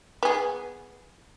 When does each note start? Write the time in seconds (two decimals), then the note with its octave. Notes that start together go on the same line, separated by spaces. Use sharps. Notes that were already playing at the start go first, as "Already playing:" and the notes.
0.23 B3 G#4